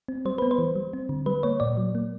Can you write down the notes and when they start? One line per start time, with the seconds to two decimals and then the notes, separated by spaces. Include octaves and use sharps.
0.08 C4
0.25 G3 C5
0.38 B3 B4
0.51 C5
0.59 E3
0.76 G3
0.93 C4
1.09 D3
1.26 G3 B4
1.43 A#3 C#5
1.60 A#2 D5
1.77 F#3
1.95 A#3